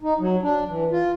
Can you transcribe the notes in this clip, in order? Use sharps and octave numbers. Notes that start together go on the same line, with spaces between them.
D#4
F#3
D4
E3
F4